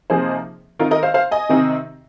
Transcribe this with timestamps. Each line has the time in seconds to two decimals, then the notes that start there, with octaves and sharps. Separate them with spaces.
0.10 C3 F3 A#3 D#4 G#4 C5
0.79 D#3 C4 D#4 F4 A#4
0.91 A#4 D#5
1.03 C5 F5
1.14 C5 F5
1.31 D#5 G#5
1.49 C3 D#3 C4 D#4